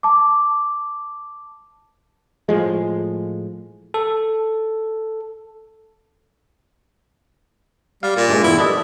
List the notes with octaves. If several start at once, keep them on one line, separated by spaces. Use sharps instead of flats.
A5 D6
A2 F3 G#3
A4
G3 F5
A#2
G2 G#3 A3
E2 B3 E4
G2 D4 A4 D#5